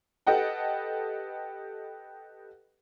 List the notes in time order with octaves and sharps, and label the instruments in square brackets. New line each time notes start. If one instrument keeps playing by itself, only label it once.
[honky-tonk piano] G4 A4 B4 D#5 F#5 G5